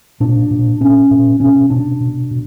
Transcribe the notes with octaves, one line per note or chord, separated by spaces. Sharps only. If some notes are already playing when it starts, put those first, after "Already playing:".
A#2 D4
A#2
A#2 C#4
A#2
B2 C#4
B2 D4
B2
B2